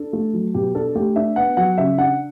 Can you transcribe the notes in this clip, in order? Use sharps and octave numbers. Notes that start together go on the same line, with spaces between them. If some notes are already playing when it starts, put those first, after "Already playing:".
Already playing: D4 A4
A3
F#3
B2 G4
D4 A4
A3 G4
D4 E5
B3 F#5
F#3 F#5
C#3 E5
D4 F#5